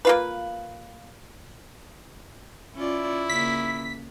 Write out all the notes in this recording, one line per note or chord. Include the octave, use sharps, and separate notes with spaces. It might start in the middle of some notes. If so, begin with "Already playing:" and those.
A#3 F4 B4
C#4 E4 F4 D5
C#3 A#3 B6